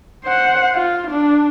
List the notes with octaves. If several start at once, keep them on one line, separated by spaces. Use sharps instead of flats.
C5 F#5
F4
D4